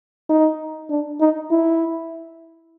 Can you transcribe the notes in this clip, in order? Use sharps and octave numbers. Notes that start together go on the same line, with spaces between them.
D#4
D4
D#4
E4